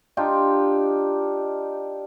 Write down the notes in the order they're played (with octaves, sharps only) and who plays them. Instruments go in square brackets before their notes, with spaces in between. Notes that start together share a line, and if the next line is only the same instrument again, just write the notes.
[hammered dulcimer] D4 D#4 F4 G4